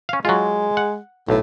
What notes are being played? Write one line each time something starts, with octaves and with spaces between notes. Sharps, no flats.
C#4 F5
F#3 G#3 F4
F#5
B1 A2